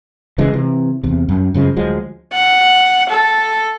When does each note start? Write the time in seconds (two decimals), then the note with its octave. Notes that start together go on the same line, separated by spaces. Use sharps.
0.38 C#3 E3 F3 G#3
0.53 C3 E3
1.03 E2 C3
1.29 F#2
1.54 F#2 C#3 F3 G#3
1.76 D2 F3 F#3 G#3
2.33 F#5
3.09 A4